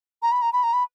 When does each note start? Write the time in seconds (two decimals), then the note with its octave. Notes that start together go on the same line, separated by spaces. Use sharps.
0.22 A#5
0.32 B5
0.42 A#5
0.53 B5
0.63 A#5
0.73 B5